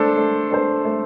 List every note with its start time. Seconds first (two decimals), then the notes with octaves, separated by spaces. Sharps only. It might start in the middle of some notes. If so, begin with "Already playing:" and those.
Already playing: A3 D4 A4 C5
0.17 A3
0.51 D4 A4 C5
0.85 A3